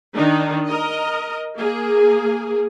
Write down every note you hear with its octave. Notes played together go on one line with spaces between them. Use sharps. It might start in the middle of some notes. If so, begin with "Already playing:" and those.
D#3 D4 D#4
A#4 D#5
A#3 G#4